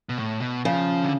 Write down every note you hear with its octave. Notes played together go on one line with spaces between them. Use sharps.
B2
A2
B2
C#3 F3
D3